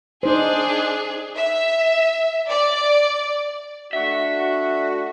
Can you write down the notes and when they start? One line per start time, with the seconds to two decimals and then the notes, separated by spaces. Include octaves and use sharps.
0.23 D4 D#4 G#4 C5 G#5
1.36 E5
2.48 D5
3.93 A3 D4 F#4 E5